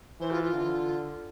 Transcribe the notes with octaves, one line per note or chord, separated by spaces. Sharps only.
E3 C5
F4
F4
D3